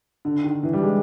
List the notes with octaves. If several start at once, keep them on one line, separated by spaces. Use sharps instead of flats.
D3
D#3
E3
G3
G#3